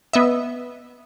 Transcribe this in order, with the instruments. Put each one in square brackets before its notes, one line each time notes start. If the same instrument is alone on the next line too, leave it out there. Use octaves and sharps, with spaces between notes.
[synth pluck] B3 D#5 E5